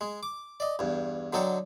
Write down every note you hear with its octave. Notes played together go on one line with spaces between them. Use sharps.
G#3
D6
D5 D#5
E2 G2
D3 F#3 D#4 A4 G5